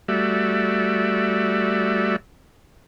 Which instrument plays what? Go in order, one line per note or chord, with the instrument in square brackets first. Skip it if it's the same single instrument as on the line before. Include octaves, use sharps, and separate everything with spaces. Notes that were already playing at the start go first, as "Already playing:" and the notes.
[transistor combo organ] G3 A3 F#4 D5 E5